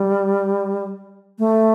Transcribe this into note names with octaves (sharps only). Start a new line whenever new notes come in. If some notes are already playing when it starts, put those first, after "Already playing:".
Already playing: G3
A3